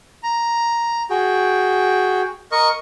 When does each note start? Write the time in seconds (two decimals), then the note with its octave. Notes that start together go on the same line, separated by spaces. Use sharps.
0.23 A#5
1.10 F#4 G#4 G5
2.52 A#4 D#5 C#6